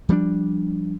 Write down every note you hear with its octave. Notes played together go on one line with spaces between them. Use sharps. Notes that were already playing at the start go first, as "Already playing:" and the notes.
F3 G3 B3 D4